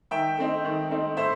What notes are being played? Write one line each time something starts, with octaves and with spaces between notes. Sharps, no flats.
D#3 E5 G5
A3 C4 D#4
D#3
A3 C4 D#4
A2 C5 E5